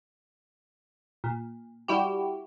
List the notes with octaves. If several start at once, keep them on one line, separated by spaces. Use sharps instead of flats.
A#2
G3 E4 F#4 G4